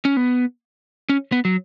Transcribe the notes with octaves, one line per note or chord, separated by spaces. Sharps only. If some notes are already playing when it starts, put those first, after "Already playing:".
C#4
B3
C#4
B3
F#3